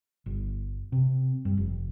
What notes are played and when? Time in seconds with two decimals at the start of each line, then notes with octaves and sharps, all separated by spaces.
0.26 G1
0.92 C3
1.45 G2
1.57 F1